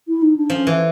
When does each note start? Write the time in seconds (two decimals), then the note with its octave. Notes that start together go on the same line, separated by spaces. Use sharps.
0.08 E4
0.22 D#4
0.36 D4
0.50 F3 C#4
0.67 E3